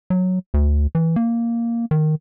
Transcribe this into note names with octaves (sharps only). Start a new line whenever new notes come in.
F#3
D2
E3
A#3
D#3